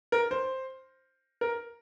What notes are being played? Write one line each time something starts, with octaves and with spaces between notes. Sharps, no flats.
A#4
C5
A#4